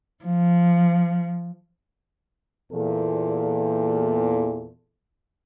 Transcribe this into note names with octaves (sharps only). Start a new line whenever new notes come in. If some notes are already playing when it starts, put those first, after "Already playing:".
F3
E2 A#2 A4